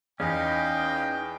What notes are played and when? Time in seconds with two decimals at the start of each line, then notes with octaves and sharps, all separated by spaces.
0.20 E2 C#4 D#4 D#5 F5 G5